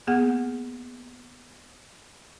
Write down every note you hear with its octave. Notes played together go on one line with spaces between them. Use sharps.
A#3 B3 G#4 F#5